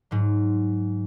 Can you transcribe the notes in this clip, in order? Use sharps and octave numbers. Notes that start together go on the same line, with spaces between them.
G#2 F#3